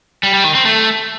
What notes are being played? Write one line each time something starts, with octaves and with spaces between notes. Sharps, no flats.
G3
G3
D#3
C4
A3